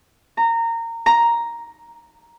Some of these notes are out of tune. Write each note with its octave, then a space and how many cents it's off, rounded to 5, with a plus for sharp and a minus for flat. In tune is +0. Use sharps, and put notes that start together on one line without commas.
A#5 -20
A#5 +5